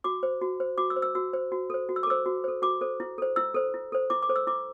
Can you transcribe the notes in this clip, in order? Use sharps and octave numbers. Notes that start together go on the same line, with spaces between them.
F#4 D6
C5
F#4
C5
F#4 D6
E6
C5
E6
F#4 E6
C5
F#4
A4 C5
F#4
E6
D6
A4 C5 E6
F#4
A4 C5
F#4 D6
A4 C5
E4
A4 C5
E4 E6
A4 C5
E4
A4 C5
E4 D6
D6
A4 C5
E6
E4 D6